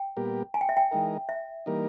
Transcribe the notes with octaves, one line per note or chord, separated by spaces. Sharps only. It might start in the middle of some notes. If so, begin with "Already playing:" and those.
Already playing: G5
A#2 G3 B3 G4 A#4
G#5
G5
E5
G5
E3 G#3 D#4 A#4
E5
E3 G3 A#3 D#4 A#4